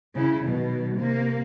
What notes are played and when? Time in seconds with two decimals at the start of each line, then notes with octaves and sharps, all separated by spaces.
0.15 C#3 E4
0.47 B2 D#3 F#3
0.95 C3 A#3